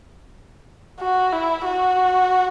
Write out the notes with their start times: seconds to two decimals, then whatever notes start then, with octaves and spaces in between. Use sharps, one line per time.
1.00 F#4
1.32 E4
1.65 F#4